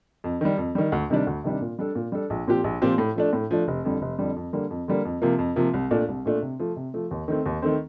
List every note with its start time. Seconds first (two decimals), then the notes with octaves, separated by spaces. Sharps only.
0.24 F2
0.41 D#3 G3
0.58 F2
0.75 D#3 G3
0.92 D2
1.10 C3 D#3 G3 D4
1.27 D2
1.44 C3 D#3 G3 D4
1.61 A#2
1.79 G3 D4 A4
1.95 A#2
2.12 G3 D4 A4
2.30 A#1
2.47 A#2 F3 C4 G4
2.64 A#1
2.82 A#2 F3 C4 G4
2.98 A2
3.15 F3 A3 D4
3.33 A2
3.51 F3 A3 D4
3.68 F1
3.85 F2 D3 G3
4.02 F1
4.19 F2 D3 G3
4.36 F2
4.53 D3 G3 A#3
4.71 F2
4.88 D3 G3 A#3
5.05 F2
5.22 C3 F3 A#3
5.39 F2
5.56 C3 F3 A#3
5.73 C2
5.91 A#2 A3 D4
6.08 C2
6.26 A#2 A3 D4
6.42 C3
6.60 F3 A3
6.76 C3
6.94 F3 A3
7.11 D#2
7.28 D#3 A3 C4
7.46 D#2
7.62 D#3 A3 C4